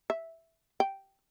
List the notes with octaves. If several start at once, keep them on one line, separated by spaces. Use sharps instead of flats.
E5
G5